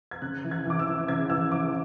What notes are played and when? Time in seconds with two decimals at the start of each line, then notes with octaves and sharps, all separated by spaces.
0.11 G#6
0.22 C#3 F#6
0.44 E3
0.51 G#6
0.65 E3 D6
0.79 E6
0.87 E3
1.08 C#3 G#6
1.30 E3 E6
1.52 E3 D6